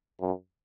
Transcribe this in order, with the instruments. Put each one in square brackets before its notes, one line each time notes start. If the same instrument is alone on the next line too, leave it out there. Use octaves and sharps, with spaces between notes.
[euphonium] F#2